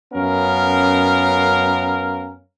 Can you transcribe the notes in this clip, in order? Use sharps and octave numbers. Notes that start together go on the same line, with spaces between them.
F#2 B3 C#4 A#4 F5